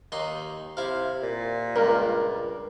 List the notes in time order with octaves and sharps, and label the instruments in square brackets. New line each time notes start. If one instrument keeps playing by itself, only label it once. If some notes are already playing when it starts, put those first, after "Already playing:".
[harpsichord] D#2 D#4 C6
[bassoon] C3 [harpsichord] E4 F5
[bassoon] A#2
[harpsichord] C#2 G2 [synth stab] A#4